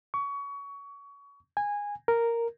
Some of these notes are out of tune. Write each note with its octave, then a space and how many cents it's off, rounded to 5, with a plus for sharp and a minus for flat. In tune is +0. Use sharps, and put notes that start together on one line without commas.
C#6 +25
G#5 -15
A#4 -5